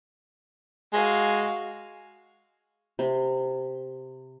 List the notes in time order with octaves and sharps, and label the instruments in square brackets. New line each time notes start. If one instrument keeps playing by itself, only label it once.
[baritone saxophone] G#3 [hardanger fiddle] F#4 F5 [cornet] G#5
[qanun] C3